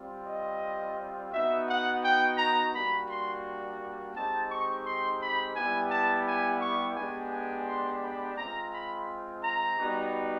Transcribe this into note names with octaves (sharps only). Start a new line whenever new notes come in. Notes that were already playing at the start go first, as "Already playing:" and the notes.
Already playing: G3 C4 F4
D#5
B3 D#4 F#4 E5
F#5
G5
A#5
G3 A#3 D4 F#4 B5
C6
G#3 C4 D#4 G4 A5
C#6
C6
B5
G3 B3 E4 G4 G#5
A5
G#5
C#6
G#3 B3 D4 G4 G#5
G#5
C6
B5
G#3 C4 F4 A#5
B5
A#5
G3 B3 D#4 F#4